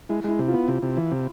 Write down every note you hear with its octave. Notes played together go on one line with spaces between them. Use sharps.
G#3 E4
G#3 E4
C3
F4
B3
C3
C3
E3
C3